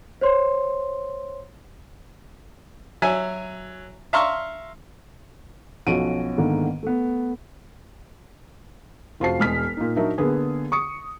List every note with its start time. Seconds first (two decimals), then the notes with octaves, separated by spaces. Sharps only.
0.21 C5 C#5 C6
3.02 F#3 E5 G#5
4.13 E5 F5 A#5 C6 C#6 F6
5.87 B1 F3 C#4 F#4 D7 D#7
6.38 G#2 D3 D#3 A#3 B3
6.83 A3 B3
9.20 F1 F4 F#4 C5 A5 C7
9.39 E1 G#3 F6 B6
9.77 A#2 D#4
9.96 F#3 D4 D#4 A#4 E5
10.18 D3 A#3 B3 G#4
10.72 C#6 D#6 C#7